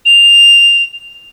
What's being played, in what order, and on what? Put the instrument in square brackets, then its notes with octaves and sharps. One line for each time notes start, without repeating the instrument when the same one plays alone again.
[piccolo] F7